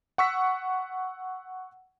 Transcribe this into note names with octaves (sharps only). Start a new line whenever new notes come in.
F#5 C#6 E6 B6